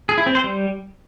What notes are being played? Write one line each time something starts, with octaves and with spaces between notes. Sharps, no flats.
G#4
E4
C4
C5
G3